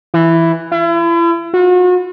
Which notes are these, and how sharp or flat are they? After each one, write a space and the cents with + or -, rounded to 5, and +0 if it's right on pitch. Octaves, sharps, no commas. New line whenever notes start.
E3 +5
E4 +40
F#4 -40